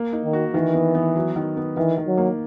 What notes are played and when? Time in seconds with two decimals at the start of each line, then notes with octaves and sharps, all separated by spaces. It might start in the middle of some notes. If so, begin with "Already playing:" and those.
Already playing: A#3
0.13 D#4
0.23 D#3
0.33 F#4
0.54 D#3 E3
0.74 B3
0.95 B3
1.16 F#3
1.36 D#3
1.57 B3
1.77 D#3 E3
1.98 D#3
2.07 F#3
2.18 A#3